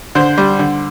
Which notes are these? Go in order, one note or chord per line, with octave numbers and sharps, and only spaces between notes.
D3 C5
G3
D3